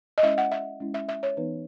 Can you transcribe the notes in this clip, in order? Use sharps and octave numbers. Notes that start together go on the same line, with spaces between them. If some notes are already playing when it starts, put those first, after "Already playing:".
D#5
G#3 C#4 E4 E5
F#5
E5
G#3 C#4 E4
E5
E5
C#5
E3 B3 D#4 B4